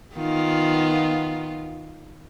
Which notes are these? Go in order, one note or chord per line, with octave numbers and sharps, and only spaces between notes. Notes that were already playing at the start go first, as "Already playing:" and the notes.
D#3 B3 F4